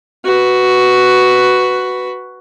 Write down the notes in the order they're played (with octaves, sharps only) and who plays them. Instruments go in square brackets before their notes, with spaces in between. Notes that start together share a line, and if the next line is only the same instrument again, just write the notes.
[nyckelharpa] F#4 B4